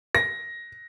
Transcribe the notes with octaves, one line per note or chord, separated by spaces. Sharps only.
A#6